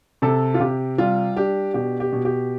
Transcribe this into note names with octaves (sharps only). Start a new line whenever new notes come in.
C3 A4
F4
C3 G4
G3 F4
D4 G4
B2 G4
G4
B2
G4